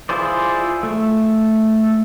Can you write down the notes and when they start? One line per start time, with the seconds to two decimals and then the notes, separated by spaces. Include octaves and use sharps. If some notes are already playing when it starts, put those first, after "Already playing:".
0.09 E4 F4 G#4 C5 D5
0.83 A3